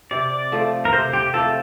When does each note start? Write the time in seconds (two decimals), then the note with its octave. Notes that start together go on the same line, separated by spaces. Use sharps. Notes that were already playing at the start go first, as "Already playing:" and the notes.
0.11 C3 D5
0.52 F3 A3
0.85 A#4
0.93 C3 C5
1.13 G4
1.34 F3 A3 A4